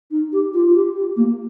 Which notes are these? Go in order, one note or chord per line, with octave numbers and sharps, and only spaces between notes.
D#4
G4
F4
G4
G4
A#3